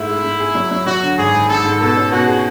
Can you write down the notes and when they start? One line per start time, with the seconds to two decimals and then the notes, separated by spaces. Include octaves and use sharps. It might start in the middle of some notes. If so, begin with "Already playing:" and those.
Already playing: G#2 A3 E4
0.09 G#3
0.24 G#2
0.40 G#4
0.55 F#3
0.71 F#3
0.86 F#3 F#4
1.03 D3
1.18 G#1 G#4
1.34 G#1
1.49 G#2 A4
1.64 G#2
1.81 B2 A4
1.96 C#4
2.12 B2 F#4
2.28 G#4